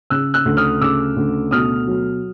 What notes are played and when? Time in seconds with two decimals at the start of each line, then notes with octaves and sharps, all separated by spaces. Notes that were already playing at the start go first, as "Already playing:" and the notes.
0.10 C#3 E6 F#6
0.34 E6 F#6
0.46 D2
0.57 D#6 F6
0.81 C#3 D6 E6
1.16 D2
1.51 B2 D#6 F6
1.87 F#3